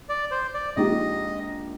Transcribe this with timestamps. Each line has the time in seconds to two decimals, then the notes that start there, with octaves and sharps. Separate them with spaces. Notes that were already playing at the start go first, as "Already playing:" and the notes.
0.09 D5
0.31 C5
0.54 D5
0.76 A#1 A#2 G#3 D#4 G4 D#5